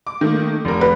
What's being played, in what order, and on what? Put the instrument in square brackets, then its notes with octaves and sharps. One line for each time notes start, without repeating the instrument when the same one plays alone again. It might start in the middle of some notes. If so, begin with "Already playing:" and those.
[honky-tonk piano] D6
D#3 A3 A#3
F1 A#4
[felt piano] B4